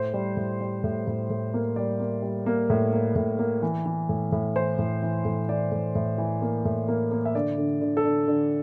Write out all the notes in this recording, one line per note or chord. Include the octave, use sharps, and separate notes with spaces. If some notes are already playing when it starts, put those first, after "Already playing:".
Already playing: A2 C5
G3
A2
G3
A2
A2
A2
A#3
G3 D5
A#3
G3
A#3
A2
A#3
A2
A#3
E3
E3
A2
A2
E3 C5
A2
E3
A2
E3 D5
A2
A2
E3
A#3
A2
A#3
A#3
E5
D3 D5
D3
D3
A4
D3
D3